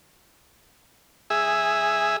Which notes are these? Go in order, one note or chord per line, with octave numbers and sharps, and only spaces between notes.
G#4 E5